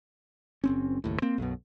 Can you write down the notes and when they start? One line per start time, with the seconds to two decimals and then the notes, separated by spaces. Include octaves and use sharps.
0.64 F#1 C4 C#4
1.04 F#1 D#2 A2
1.22 A#3 C4
1.38 B1 F#2 B2